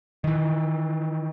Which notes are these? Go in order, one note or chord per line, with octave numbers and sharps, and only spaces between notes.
D#3 E3